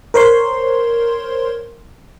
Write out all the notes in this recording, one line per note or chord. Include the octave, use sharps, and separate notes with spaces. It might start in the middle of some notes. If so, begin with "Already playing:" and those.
A#4 C5 C#5 C6